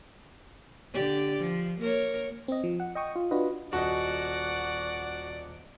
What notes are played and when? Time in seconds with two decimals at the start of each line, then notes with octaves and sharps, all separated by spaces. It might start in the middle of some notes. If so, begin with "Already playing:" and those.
0.94 D3 G4 D5
1.38 F3
1.80 A#3 A#4 C#5
2.48 C4 D#5
2.64 F3
2.80 F#5
2.95 D#5 G5 C#6 D#6
3.16 F4
3.31 D4 F4 F#4 B4 D#5
3.73 D#1 F#4 D5 D#5 F#5